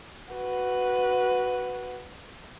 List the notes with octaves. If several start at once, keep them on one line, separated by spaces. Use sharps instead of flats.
F#4 B4